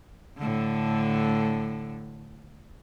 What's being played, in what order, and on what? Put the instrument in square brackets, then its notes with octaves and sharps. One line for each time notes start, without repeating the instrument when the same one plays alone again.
[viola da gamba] A2 D3